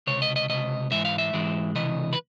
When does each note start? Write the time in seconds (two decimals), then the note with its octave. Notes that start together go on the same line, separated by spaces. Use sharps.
0.07 C#2 C3 C#5
0.22 D#5
0.36 D#5
0.49 C#2 C3 D#5
0.91 G#2 E3 G#3 E5
1.05 F5
1.18 E5
1.33 G#2 E3 G#3
1.75 C#2 C3 E3 D#5
2.13 B4